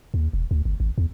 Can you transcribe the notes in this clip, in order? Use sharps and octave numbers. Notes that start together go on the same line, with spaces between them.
D#2
E1
D2
G1
G#1
E2